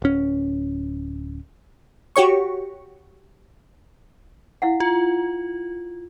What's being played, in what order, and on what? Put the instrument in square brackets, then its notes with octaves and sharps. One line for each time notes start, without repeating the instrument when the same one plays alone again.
[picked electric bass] D1 C#4
[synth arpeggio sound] F#4 G4 C#5 C#6
[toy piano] E4 F5 F#5
[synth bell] F4